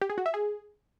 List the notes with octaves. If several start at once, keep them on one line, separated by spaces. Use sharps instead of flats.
G4
G#4
F#4
E5
G#4